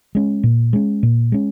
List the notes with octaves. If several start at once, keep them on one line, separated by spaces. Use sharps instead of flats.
G#3 C#4
A#2
G#3 C#4
A#2
G#3 C#4